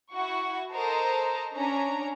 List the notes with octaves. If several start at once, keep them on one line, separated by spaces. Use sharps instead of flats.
E4 F#4 F#5 C#6
A4 A#4 C5 D#5 A5 A#5
C#4 D4 A#5